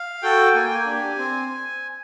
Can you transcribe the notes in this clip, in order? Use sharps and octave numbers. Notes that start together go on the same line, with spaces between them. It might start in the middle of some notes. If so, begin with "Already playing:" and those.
Already playing: F5
F#4 A4 G5
A#3 G#5
G5
G#5
D4 G4
C4